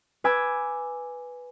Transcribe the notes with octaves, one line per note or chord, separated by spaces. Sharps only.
B4 G#5 D6 E6 G#6